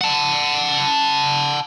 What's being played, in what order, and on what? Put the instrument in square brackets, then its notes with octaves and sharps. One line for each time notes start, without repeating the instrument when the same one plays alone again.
[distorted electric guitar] F#5 A5